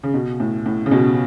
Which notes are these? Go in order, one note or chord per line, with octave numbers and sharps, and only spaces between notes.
C#3
B2
A2
A2
C#3
B2